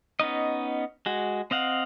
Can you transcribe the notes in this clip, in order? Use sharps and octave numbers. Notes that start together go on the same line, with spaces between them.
B3 C#4 D#4 D#5
G#3 F#4
C4 D#5 F5 F#5